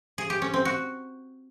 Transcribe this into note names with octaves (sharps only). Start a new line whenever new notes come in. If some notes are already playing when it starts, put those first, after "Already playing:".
G#4
G4
C#4
C4
F#4